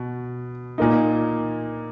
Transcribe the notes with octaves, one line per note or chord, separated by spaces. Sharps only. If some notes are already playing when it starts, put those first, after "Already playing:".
Already playing: B2
A#2 A#3 D#4